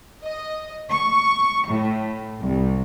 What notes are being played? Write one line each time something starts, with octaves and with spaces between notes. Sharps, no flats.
D#5
C#6
A2
C2